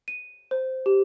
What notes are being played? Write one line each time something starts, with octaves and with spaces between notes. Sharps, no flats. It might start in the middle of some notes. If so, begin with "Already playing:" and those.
D#7
C5
G4